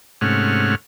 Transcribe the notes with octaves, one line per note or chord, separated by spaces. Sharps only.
G#2 C3 A3 C#4 F#5 F6